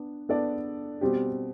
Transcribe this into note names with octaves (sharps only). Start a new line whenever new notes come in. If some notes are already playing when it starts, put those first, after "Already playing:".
Already playing: B3 D4
B3 D4 A4 D5
B2 G3 C4 G4